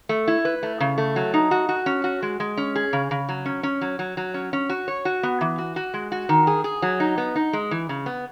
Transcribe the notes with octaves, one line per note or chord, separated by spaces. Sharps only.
A3
E4
B4
A3
C#3
A3
F#3
D#4
F#4
F#4
C#4
F#4
G#3
G#3
C#4
G#4
C#3
C#3
F#3
C#4
C#4
F#3
F#3
F#3
C#4
C#4
F#4
C#5
F#4
B3
E3
F#4
F#4
G#3
F#4
D#3
G#4
G#4
F#3
D#4
B3
D#4
G#3
E3
C#3
B3